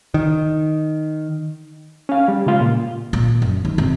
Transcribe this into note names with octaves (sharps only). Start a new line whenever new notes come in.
D#3
C#4 F5
G3
C#3 G#3 F4
A#2
A#2
F#2
D#2
C3